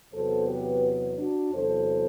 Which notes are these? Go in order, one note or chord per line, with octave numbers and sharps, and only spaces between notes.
E2 C3 F#3 B3 A4 C5
G4 B4
D4 F#4
E2 C3 F#3 A4 C5